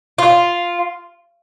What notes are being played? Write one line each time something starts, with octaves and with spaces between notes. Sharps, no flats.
F4